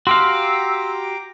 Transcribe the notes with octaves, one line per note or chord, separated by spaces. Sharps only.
F#4 G4 F5 G5 A#5 C6 D6 E6